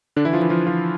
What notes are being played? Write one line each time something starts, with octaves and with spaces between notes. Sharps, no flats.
D3 D4
E3 E4
F3 F4
E3 E4
F3 F4
F3 F4